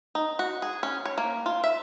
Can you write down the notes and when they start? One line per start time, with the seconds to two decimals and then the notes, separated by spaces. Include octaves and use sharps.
0.15 D#4
0.39 F#4
0.62 G#4
0.83 C#4
1.06 C#5
1.18 A#3
1.46 F4
1.64 E5